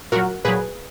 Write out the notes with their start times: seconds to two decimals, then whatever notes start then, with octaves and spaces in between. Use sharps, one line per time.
0.12 A#2 F#3 F#4 A#4
0.45 A#2 F#3 G#4 B4